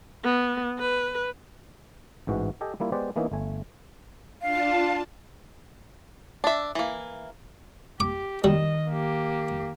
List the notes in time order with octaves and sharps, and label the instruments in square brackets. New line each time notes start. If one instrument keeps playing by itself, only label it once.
[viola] B3
B4
[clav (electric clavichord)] A1 G#2 E3 F#4
G4 A4 D#5 G5 G#5
G3 A#3 E4 F4
G#3 B3 G4 B4 C5 D5
E3 A#3 B3 C#4 D#4 E4
G1 A3 G#5
[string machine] D4 F4 A5 [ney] F5
[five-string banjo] D4 E5
E3 A#3
[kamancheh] G4 [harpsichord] D6
[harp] D#3 E7 [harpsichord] G3 [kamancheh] D#5
[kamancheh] A#3 G4